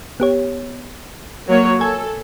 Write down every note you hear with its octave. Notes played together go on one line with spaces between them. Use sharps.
B3 G4 C#5
F#3 A#3 C#5
A4 G#5 G#6